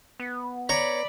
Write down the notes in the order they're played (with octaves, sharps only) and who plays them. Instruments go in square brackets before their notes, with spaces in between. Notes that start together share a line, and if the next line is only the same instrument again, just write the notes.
[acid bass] B3
[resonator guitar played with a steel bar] C#5 [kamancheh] D5 B5 [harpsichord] A#5